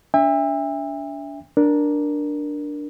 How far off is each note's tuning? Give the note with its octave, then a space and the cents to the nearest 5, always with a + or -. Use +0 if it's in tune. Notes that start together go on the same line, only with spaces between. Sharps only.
D4 -35 E5 +0 G5 +45
D4 +0 A#4 +10